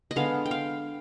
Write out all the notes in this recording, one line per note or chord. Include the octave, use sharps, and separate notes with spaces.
D#5
D3 G#3 B3 F5
G5
F5